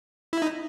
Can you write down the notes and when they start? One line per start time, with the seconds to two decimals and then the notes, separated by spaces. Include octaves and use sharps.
0.33 E4
0.42 D#4